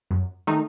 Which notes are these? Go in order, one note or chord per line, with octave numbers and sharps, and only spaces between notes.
F#2
D#3 A3 D#4